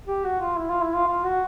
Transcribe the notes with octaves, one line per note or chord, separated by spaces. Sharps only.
G4
F#4
F4
E4
F4
E4
F4
F4
F#4